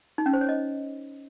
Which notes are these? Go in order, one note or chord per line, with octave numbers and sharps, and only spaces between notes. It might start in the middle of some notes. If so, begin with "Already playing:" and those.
D#4
C#4
C5
C#5
D#5